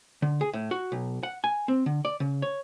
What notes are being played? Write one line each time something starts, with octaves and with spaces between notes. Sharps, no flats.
D3
G#4
A2
F#4
B1
F#5
G#5
C4
D3
D5
C#3
C#5